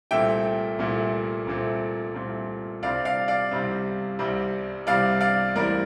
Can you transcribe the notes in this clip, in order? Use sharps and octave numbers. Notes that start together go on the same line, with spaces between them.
C2 A#2 A3 C4 E5 G5
C2 A#2 A3 C4
C2 A#2 A3 C4
C2 A#2 A3 C4
C2 C3 G3 C4 D5 F5
D5 F5
D5 F5
C2 C3 G3 C4
C2 C3 G3 C4
C2 C3 G3 C4 D5 F5
D5 F5
A1 A2 G3 C4 A#4 D5